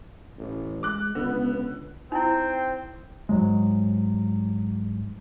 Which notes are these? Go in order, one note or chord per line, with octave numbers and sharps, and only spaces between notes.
A1
G#3 D6 F#6
C#2 D3 B3
C4 D#4 E4 G5
G#2 F#3 G#3